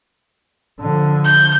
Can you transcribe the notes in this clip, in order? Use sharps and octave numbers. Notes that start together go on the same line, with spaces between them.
D3 F3
G6